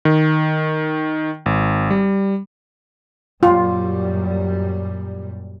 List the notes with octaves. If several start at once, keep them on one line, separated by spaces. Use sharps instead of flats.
D#3
G#1
G3
F#2 A#2 G3 F4